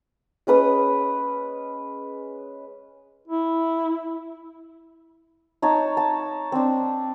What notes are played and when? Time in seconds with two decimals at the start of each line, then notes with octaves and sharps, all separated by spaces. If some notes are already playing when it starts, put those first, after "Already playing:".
0.47 G#3 C#4 B4 D#6
3.28 E4
5.62 D#4 C#5 A5
5.97 A5
6.52 C4 D4